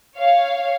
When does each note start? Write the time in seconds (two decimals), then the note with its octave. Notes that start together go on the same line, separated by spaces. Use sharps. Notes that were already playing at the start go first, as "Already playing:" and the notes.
0.17 C#5 F5